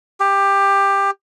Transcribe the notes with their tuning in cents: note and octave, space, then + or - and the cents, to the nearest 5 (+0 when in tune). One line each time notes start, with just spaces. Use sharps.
G4 +15